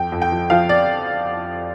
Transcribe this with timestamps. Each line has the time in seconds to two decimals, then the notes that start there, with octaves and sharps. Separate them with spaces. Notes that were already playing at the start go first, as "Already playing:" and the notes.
Already playing: F2 G5
0.12 F2
0.22 G5
0.32 F3
0.50 F3 F5
0.69 D5